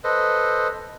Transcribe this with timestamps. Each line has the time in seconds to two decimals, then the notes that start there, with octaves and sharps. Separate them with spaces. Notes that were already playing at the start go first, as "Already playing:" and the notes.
0.04 A4 B4 C5 D#5